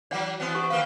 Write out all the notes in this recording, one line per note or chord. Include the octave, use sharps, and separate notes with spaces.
E3 F#3 D5 F#5
E3 B3 C4
G4 F#5 C#6
D#3 A#3 B4 F5